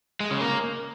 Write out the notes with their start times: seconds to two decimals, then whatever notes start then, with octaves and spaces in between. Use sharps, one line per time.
0.20 G#3
0.30 C#3
0.40 A#3